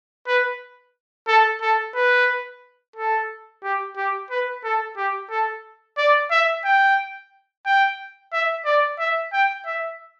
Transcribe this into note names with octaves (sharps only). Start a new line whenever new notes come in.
B4
A4
A4
B4
A4
G4
G4
B4
A4
G4
A4
D5
E5
G5
G5
E5
D5
E5
G5
E5